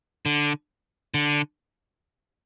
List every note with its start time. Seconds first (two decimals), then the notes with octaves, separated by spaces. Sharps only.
0.26 D3
1.14 D3